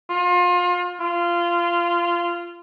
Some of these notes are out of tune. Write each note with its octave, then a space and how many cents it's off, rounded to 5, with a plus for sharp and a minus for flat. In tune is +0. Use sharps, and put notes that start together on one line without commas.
F4 +30
F4 -15